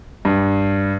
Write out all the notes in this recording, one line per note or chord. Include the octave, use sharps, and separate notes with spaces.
G2